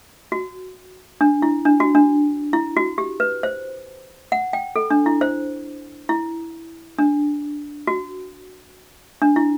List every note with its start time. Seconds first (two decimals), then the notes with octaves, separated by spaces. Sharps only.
0.32 F#4
1.21 D4
1.42 E4
1.65 D4
1.80 F#4
1.95 D4
2.53 E4
2.77 F#4
2.98 G4
3.20 B4
3.43 C5
4.32 F#5
4.53 G5
4.76 A4
4.90 D4
5.06 E4
5.21 C5
6.09 E4
6.99 D4
7.87 F#4
9.22 D4
9.36 E4